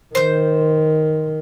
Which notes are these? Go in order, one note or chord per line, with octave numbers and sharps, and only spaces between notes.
D#3 C5 G6